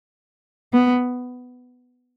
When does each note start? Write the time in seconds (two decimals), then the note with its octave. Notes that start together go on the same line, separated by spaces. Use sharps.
0.73 B3